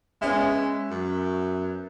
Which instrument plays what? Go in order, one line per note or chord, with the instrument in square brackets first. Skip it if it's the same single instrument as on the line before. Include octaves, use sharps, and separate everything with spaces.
[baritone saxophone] G#3 [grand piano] B3 C#4 E5
[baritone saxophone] F#2